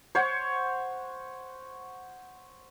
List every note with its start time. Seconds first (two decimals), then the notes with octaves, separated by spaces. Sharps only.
0.15 C5 C#5 F#5